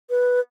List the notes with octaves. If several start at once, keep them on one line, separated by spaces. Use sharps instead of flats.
B4